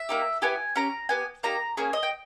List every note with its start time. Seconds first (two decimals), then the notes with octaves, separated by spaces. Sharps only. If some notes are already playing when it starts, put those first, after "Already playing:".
Already playing: E5
0.09 A#3 D#4 G4
0.42 B3 E4 G4 G#5
0.76 C#4 G4 A#5
1.09 B3 G4 G#5
1.43 A#3 D#4 G4 A#5
1.77 A#3 C#4 G#4 G#5
1.93 D#5
2.03 G5